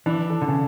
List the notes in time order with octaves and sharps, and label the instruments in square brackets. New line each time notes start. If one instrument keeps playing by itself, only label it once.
[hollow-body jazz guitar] E3 [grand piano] D4
[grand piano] A4
[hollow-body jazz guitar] D3
C#3